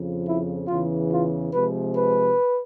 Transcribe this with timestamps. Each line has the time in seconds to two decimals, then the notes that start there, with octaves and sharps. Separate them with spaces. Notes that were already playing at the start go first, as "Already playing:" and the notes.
Already playing: F2 C#3 F3
0.26 E4
0.68 E2 C#3 E3 F4
1.10 F4
1.53 C3 F3 G#3 B4
1.95 B4